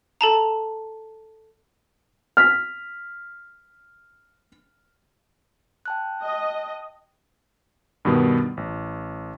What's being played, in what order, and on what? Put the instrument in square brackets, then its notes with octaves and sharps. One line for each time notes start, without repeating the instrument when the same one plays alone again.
[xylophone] A4 A5 A#5
[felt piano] F6 B6
[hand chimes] G5 A5 F#6
[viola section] D#5
[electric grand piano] G2 B2 D#3 G3 B3
A1